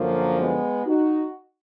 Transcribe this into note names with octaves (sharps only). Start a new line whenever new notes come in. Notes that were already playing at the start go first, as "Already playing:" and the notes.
Already playing: F#2 D3 F3 F#3 A#3
G#3 B3
D#4 F#4